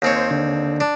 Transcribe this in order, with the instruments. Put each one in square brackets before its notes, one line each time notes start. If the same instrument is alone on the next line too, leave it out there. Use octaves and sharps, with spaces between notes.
[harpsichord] D#2 C4 C#5
[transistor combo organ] C5
D3
[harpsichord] D4